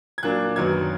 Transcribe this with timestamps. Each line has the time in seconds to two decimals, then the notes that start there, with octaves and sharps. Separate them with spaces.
0.18 G#6
0.23 A#2 F#3 A#3 D4 F#6
0.56 F#2 D#3 F#3 B3 G#6